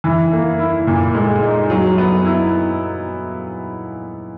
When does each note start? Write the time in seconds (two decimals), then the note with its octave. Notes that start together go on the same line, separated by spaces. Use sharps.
0.04 E3
0.32 A#3
0.59 E4
0.87 A#2
1.15 G#3
1.43 D#4
1.70 F#3
1.98 B3
2.25 E4